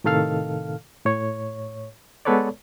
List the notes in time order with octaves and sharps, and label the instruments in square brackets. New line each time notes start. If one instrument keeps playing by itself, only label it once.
[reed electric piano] A2 C3 D#3 A4 F5 F6
A2 C#5
G#3 B3 A4 B4 C#5 D5